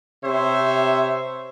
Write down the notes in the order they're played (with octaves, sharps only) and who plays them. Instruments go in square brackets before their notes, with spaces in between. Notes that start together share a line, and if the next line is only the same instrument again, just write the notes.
[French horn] C3 [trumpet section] C5 C#5 E5